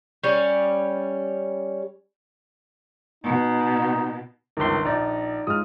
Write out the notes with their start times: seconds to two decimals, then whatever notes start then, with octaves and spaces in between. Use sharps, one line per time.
0.24 G3 C#4
3.24 B2 D#4
4.57 G1 C#2 D#3 C6
4.85 A#1 D#4 D5
5.47 G#2 G#3 F4 D#6 F6